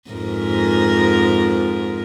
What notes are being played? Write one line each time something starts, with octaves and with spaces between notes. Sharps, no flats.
F2 G#2 A#4